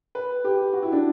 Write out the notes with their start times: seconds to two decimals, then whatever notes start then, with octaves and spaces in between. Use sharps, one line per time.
0.15 B4
0.44 G4
0.73 F#4
0.82 E4
0.92 D4